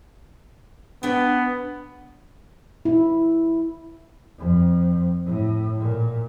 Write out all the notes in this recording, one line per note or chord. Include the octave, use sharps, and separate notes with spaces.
B3 D4 G5
E4
F2
A2
A#2